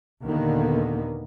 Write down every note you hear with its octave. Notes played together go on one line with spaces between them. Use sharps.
D#2 A#2 D3 D#3 A#3 B3